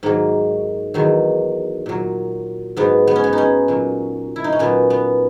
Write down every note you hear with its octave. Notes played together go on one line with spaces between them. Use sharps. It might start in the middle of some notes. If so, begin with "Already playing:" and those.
G#2 D#3 F#3 A#3
E2 D#3 F#3
A#2 F#3
G#2 F#3 B3
B3
C#4
B3
C#4 D#4
A#2 F#3
E4
D#4
C#4
A#2 F#3 B3
B3